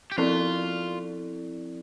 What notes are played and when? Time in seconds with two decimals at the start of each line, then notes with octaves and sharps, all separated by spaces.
0.12 G4
0.18 F3 C4 E4 F4 A4 D5